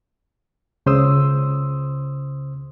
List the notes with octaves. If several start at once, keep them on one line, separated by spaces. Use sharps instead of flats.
C#2 C#3 C5 C6 D#6 E6